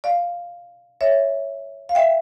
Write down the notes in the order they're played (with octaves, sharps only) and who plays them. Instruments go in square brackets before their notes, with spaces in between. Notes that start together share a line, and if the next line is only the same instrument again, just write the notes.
[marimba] D5 F5
C#5 E5
F5
E5 G5